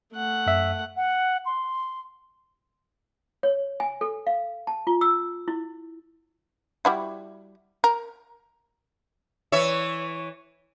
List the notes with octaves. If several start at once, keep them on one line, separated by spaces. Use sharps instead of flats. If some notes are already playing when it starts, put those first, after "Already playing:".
A3 F#5
F#2 E5
F#5
C6
C#5
G#5
A4
F5
A5
F4
E6
E4
G3 E4 F#4
A#4
E3 C#5 E5